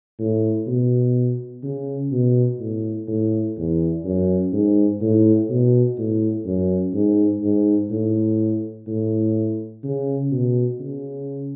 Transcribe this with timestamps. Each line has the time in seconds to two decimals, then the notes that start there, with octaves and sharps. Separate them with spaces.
0.19 A2
0.67 B2
1.63 C#3
2.12 B2
2.60 A2
3.08 A2
3.57 E2
4.05 F#2
4.53 G#2
5.01 A2
5.50 B2
5.98 A2
6.46 F#2
6.94 G#2
7.42 G#2
7.91 A2
8.87 A2
9.84 C#3
10.32 B2
10.80 C#3